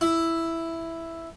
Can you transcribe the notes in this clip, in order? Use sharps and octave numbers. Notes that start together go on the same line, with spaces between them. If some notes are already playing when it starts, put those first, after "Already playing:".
E4